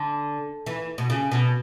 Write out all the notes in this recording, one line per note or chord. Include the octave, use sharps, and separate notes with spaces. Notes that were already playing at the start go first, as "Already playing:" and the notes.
Already playing: D3
E3
B2
C#3
B2